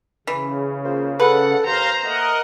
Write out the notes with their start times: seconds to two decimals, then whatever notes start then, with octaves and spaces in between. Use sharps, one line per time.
0.27 C#3 E3
0.84 A#3 F4 C5
1.20 A4 B4 F#5
1.66 D#2 C5 F5 A#5 C6
2.03 A3 A#3 A#4 D#5 F#5